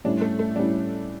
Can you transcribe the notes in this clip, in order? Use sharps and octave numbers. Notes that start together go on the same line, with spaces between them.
A2 G3 C#4 D4 E4
A3
A3
A2 G3 C#4 D4 E4